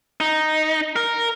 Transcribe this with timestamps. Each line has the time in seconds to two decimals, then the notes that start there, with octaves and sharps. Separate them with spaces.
0.21 D#4
0.96 A#4